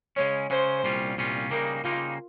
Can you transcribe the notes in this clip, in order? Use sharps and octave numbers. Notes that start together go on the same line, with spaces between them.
C#3 G#3 C#4 C#5
C#3 G#3 C#4 C5
C2 A#2 G3 C#4 F4
C2 A#2 G3 C#4 F4
C#3 G3 A#3 D#4 A#4
C#3 G3 A#3 D#4 F4